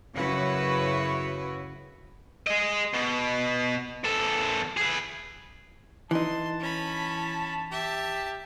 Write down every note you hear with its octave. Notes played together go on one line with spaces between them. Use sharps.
F#2 C#3 E4 F#4 B4 C#5
G#4 D#5
B2
E2 A4
G#4 B4
E3 D#4 A5 C6
C#4 B5
G4 E5 A5